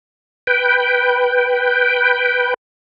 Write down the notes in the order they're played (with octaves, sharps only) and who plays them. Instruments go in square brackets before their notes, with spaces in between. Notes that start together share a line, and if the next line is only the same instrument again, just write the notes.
[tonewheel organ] B4 G5